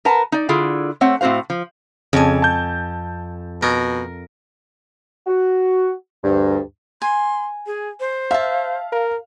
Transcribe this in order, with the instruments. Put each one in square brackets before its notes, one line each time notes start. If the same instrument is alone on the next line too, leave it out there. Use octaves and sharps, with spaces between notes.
[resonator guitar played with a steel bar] A#4 B4 F#5 A5 A#5
D#4 D5
D3 E4 F4 G#4
A3 C4 C#5 F#5
A2 C4 F#4 C5 F5
F3
[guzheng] F2 G#5 [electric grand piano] C#3
[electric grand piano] A5 G6
[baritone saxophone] B2 [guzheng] A#4
[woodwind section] F#4
D2 G2
[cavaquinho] G#5 [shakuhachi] C6
[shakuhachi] G#4
C5
[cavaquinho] E5 A5 [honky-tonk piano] F5
[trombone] A#4